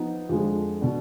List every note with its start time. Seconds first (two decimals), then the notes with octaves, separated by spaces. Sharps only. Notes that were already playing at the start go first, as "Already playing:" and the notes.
Already playing: F3 B3 D#4
0.29 F2 D3 F3 G#3
0.81 B2 B3 D4